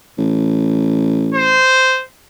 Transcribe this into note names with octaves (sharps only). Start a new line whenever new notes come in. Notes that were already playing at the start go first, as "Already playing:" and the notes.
A1
C5